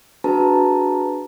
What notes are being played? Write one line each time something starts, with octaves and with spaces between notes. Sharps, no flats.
D4 F#4 G#4 B4 A5 A#5